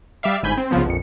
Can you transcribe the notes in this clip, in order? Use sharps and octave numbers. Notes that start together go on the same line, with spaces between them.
G3 D5 E5 F5
G1 G#2 G#5 B5 G6
C4
C2 C#3 F3 B3
A#1 F2 C#7